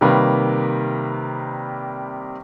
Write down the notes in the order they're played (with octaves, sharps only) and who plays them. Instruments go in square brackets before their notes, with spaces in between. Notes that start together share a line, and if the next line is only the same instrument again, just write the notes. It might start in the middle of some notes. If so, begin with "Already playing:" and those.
[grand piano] C3 D#3 G3 A#3 B4